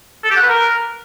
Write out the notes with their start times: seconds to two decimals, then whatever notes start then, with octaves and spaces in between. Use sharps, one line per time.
0.24 A4
0.30 G4
0.36 F#5
0.42 B4
0.49 A#4